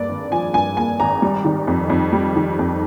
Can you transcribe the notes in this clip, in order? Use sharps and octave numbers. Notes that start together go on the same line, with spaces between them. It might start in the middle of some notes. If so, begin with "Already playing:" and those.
Already playing: G2 A#3 D5
G#1
F3 G#5
G2 G#5
A#3 G#5
G#1 A#5
G3
D#3
F2
F2
G3
D#3
F2